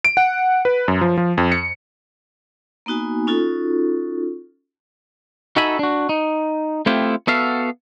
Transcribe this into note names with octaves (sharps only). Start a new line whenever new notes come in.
D7
F#5
B4
F#2
F3
F3
F2
C#7
A#3 B3 D#4 F#4 G#5
C#4 D#4 F4 F#4 A4
D#4 F#4 A4 E5 G#5 B5
D4 F#4
D#4
A3 B3 C4 E4 F4 G4
B3 F#4 A4 E5 F5